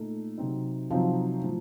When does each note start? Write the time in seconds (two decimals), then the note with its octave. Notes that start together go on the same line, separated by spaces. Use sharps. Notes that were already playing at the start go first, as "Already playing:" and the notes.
Already playing: A#2 A3 D#4
0.38 C3 F#3 C4 D#4
0.90 C3 F3 F#3 C4 D#4
1.44 A2 F3